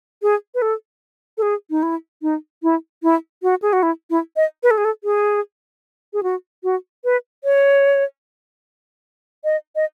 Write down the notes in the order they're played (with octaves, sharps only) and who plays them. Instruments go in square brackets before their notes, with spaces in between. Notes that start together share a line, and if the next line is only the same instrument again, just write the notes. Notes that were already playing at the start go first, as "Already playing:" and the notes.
[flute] G#4
B4
A4
A4
G#4
D#4
E4
D#4
E4
E4
F#4
G#4
F#4
E4
E4
D#5
B4
A4
G#4
A4
G#4
G#4
F#4
F#4
B4
C#5
D#5
D#5